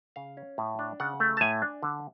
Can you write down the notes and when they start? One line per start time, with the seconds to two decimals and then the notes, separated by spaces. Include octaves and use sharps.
0.16 C#3 F5
0.37 C#4
0.58 A2
0.79 D4
1.00 C#3 F#5
1.20 A3
1.37 A5
1.41 A2 G#5
1.62 D4
1.83 D3